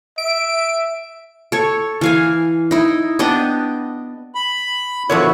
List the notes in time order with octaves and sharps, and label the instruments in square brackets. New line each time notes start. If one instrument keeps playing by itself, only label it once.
[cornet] E5 [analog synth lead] D7
[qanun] A4 C#5
E3 F5 G#5
D#4 E4
B3 D4 G4 D#5
[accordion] B5
[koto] A#2 D3 F3 [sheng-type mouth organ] B3 E4 F#4 [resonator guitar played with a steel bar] C#5